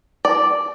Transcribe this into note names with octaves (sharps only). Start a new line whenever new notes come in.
D5